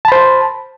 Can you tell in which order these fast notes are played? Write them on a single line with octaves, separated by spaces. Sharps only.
A5 B5 C5